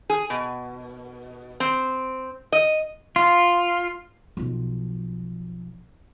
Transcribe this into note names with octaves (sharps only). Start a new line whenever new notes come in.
G#4
B2
C4
D#5
F4
B1 F3